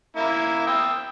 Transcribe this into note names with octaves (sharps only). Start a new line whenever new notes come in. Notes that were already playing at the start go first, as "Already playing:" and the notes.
A#3 E4
G5 D#6 E6